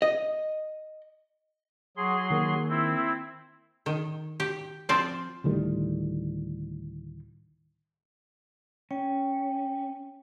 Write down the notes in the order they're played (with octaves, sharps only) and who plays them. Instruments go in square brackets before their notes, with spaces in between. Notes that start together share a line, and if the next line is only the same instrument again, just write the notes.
[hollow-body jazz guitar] D#5
[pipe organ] F#3 G#4 C6
[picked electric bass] D#3 A#3
[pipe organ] C4 E4
[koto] D#3
G4
F3 C4 F4 D5
[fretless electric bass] D2 A2 D#3 G3
[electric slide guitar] C#4 [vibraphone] G5